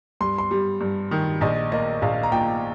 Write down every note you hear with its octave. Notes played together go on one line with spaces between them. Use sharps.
G2 C6
C6
G3
G2
D#3
A#1 D#5
A#3 D#5
A#1 F5
A#5
A#2 G5